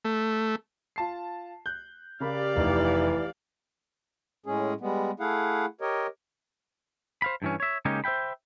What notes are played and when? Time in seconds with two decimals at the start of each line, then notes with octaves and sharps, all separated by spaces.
0.05 A3
0.96 F4 A5 C7
1.66 F#6 G6
2.20 C#3 G4 A#4 D5 F5 B5
2.56 F1 E3 D#4
4.46 A2 G#3 C#4 G#4
4.81 G3 G#3 B3
5.20 A3 E4 G#4 F5 F#5
5.81 G4 A#4 C#5 D#5
7.22 C5 F5 B5
7.42 G2 E3 C#4
7.60 C#5 E5
7.85 C#3 G#3 A#3 C#4 D#4 G4
8.04 C5 E5 F5 G5 B5